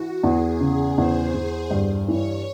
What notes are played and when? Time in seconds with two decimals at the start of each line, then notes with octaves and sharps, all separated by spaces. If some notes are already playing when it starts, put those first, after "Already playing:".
Already playing: E3 F#4
0.23 E2 G#4
0.60 C#3
0.98 E2 C5
1.34 E2
1.71 G2
2.08 E3 C#5